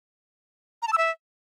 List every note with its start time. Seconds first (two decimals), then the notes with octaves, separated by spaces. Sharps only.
0.82 A#5
0.87 A5
0.93 E6
0.98 E5